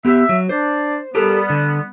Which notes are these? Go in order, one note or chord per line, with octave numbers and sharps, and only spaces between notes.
B3 G4 E5
F#3
D4 C5 D5
G3 B3 G4 A4 A#4
D3